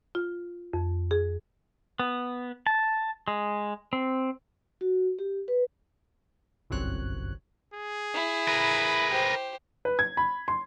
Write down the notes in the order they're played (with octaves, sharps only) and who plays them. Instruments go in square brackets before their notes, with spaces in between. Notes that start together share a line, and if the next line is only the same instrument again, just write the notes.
[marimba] F4
F2
G#4
[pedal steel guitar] B3
A5
G#3
C4
[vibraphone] F#4
G4
B4
[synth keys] G1 C2 F#2 C4 C#5 F#6
[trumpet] G#4
[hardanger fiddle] E4
[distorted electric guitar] A#4 B4
[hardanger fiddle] G4 C5
[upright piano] B4
G#6
B5
C6